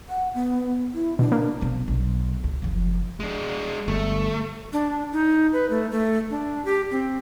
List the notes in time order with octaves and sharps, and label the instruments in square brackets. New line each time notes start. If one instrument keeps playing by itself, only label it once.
[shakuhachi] F#5
B3
E4
[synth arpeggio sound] B2 [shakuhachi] D4
[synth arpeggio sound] A#3
[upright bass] B1 C4
B1
C#2
F#1 F3
[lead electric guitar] G#3 D4
[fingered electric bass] G1 [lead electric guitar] A3
[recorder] D4
D#4
B4
A3
A3
D4
G4
C4